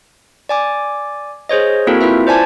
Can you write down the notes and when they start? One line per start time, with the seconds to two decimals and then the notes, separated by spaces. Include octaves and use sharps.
0.49 D5 G#5 D6
1.49 G#4 C5 C#5 D#5
1.87 A#3 C4 E4 F#4 A4 A#4
2.01 E4 F4 B4 E5
2.27 C5 D5 G#5 A5 G#6